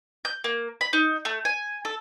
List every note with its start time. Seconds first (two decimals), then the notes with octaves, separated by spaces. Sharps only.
0.25 G6
0.44 A#3
0.81 B5
0.93 D#4
1.25 A3
1.45 G#5
1.85 A4